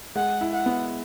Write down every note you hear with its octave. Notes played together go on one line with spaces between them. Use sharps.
G#3 F#5
E4
F#5
B3